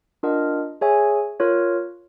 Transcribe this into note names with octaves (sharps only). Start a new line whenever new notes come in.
D4 F4 A#4 D#5 F#5
G#4 C#5 E5 G#5
F4 A#4 C#5